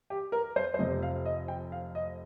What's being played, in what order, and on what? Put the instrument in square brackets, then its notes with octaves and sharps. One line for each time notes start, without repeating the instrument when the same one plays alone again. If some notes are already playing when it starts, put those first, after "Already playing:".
[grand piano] G4
A#4
C5
C5
F1 F2 C3 D#5
F5
D#5
G5
F5
D#5